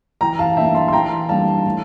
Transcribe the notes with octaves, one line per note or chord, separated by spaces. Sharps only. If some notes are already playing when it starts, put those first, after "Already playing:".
E3 G5 A#5
F5 A5
A#3 D4 E5 G5
A5 C6
C6
E3 G5 A#5
G3 A#3 D4 F5 A5
A2